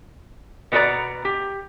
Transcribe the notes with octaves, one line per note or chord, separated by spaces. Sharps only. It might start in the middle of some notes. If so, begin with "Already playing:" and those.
B2 B3 F#4 B4 D5 A#5
G4